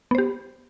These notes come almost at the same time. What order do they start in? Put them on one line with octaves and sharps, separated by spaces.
B3 C5 G4